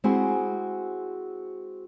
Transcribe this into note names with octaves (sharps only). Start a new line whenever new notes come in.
G#3 C4 E4 F#4 G#4 C5